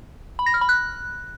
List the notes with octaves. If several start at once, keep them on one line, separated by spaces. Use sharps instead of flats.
B5
A#6
F6
B5
F#6